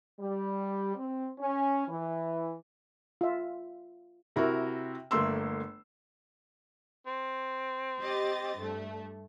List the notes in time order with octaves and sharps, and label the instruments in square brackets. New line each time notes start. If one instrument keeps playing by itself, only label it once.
[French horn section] G3
C4
C#4
E3
[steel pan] F4 E5
[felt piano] C3 E4 F#4 A#4
G1 A3 A#3 C6 E6
[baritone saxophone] C4
[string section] G4 D#5 A6
G2 A3